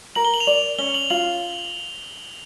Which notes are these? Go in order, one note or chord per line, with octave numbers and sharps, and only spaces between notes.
A#4 F#7
G7
F#7
F7
D5 F#7
C#4 G7
F#7
F4 F#7